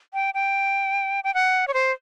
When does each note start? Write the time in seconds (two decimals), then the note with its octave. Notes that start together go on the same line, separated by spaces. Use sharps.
0.14 G5
0.34 G5
1.24 G5
1.34 F#5
1.68 C#5
1.74 C5